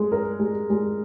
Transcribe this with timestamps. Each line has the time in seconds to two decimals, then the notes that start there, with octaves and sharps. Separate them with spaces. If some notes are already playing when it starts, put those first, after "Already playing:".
Already playing: G#3
0.12 A#4
0.40 G#3
0.70 G#3